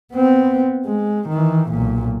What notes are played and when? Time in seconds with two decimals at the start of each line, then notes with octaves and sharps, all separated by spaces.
0.14 B3 C4
0.86 G#3
1.29 D#3 E3
1.70 B1 A#2